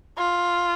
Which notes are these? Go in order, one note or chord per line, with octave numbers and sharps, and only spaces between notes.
F4